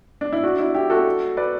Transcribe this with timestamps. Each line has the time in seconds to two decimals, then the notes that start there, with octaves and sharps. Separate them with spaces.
0.21 D4
0.33 E4
0.43 D4 F#4
0.59 E4
0.75 E4 G4
0.90 F#4 A4
1.37 B4 D5